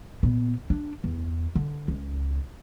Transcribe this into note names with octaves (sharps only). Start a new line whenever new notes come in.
A#2 B3
D4
E2
D3
C#2